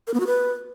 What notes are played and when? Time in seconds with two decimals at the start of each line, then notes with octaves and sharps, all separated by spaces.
0.07 A#4
0.14 B3
0.20 F#4
0.27 B4